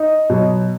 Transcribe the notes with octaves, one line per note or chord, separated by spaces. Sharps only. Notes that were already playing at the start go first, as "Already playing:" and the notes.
Already playing: D#4
B2 F#3